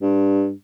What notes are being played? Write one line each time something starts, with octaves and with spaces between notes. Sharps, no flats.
G2